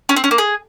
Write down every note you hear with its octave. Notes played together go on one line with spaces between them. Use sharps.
C#4
C4
C#4
A#3
G#4